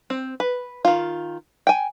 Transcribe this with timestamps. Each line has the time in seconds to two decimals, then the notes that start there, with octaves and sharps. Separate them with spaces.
0.10 C4
0.40 B4
0.85 D#3 F4
1.67 G5 G#5